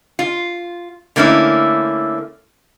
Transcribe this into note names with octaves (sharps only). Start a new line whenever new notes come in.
F4
D3 A3 A#3 C#4 E4